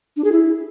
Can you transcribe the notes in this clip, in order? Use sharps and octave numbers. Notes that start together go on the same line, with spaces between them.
D4
G#4
E4